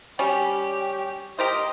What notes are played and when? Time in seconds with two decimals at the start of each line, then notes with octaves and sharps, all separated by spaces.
0.19 G3 C#4 G4
1.39 G4 A#4 C5 D#5